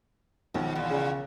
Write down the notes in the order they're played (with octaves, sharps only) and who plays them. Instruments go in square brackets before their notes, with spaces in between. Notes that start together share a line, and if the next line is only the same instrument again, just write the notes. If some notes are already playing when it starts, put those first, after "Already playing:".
[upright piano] B1 D#3 F3 [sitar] G#2
[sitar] E2 A#2
[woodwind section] C#3